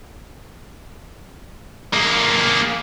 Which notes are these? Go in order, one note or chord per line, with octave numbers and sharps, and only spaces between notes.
A#3 G#4